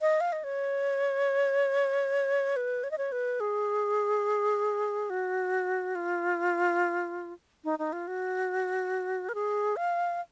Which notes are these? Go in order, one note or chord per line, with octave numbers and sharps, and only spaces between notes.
D#5
F5
D#5
C#5
B4
C#5
D#5
C#5
B4
G#4
F#4
F4
D#4
D#4
F4
F#4
A#4
G#4
F5